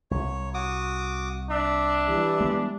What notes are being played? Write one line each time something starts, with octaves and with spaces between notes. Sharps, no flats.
C2 C#5
F#4 D6 D#6
D4 E5
E3 G3
G#3 B3